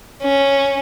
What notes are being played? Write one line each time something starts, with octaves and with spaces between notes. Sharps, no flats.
C#4